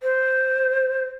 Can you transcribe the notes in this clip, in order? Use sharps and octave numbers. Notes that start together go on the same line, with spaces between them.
C5